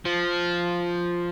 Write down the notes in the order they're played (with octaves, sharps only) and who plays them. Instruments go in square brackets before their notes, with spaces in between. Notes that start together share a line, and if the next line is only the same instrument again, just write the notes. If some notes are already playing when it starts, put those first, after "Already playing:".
[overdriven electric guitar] F3